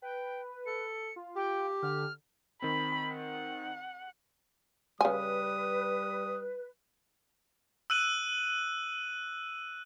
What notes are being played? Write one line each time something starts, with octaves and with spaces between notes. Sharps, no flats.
B4 G5
A4 C#7
F4
G4 G5
D3 F6
D#3 C4 B5
F#5
C#3 G3 B4 G#5 D#6
E6 F#6 D#7 F#7